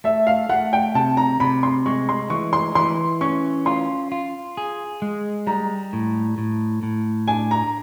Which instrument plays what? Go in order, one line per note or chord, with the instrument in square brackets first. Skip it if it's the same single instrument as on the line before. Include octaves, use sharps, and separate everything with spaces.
[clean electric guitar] A3 [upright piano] E5
[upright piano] F5
[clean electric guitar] A3 [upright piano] F#5
[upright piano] G5
[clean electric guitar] C3 [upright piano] A5
[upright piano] A#5
[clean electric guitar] C3 [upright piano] B5
[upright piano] C6
[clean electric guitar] G#3 [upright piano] C#6
[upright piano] C6
[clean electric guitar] E3 [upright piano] C#6
[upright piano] C6
[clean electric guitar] E3 [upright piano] C6
[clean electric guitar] C#4 [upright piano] C#6
[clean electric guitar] F4 [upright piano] C6
[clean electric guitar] F4
G#4
G#3
[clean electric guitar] G3 [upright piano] A#5
[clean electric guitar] A2
A2
A2
[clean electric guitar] D4 [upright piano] G#5
[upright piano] A#5